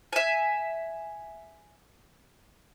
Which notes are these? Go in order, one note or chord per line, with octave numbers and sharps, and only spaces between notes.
E5 G#5